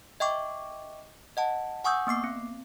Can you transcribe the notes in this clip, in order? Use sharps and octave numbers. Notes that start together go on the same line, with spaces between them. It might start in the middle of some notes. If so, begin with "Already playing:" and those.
D#5 E5 G5 C#6 D6
D#5 F#5 A5
F#5 G#5 C#6 D#6 E6 G6
A#3 B3 D6 C7
C4